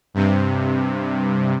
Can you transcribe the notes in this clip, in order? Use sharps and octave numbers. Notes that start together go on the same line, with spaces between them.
G2 C3